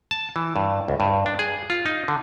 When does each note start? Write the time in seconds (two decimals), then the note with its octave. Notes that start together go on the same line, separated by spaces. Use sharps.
0.11 A5
0.36 E3
0.56 G2
0.88 C#2
1.00 G2
1.26 D4
1.39 G#4
1.70 F4
1.86 D#4
2.08 D3